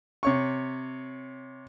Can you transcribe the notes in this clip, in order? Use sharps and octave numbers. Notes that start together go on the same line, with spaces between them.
C3 C#5 C#6